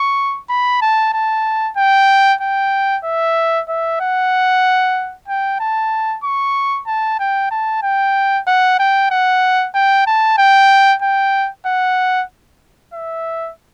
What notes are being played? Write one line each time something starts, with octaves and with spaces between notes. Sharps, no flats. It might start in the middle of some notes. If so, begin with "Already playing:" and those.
Already playing: C#6
B5
A5
A5
G5
G5
E5
E5
F#5
G5
A5
C#6
A5
G5
A5
G5
F#5
G5
F#5
G5
A5
G5
G5
F#5
E5